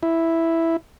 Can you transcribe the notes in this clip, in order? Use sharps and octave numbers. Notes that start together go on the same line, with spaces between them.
E4